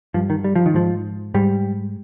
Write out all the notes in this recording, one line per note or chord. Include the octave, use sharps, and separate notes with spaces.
G2 F3
D#3
G3
F3
D#3
G#2 F3
G#2 G3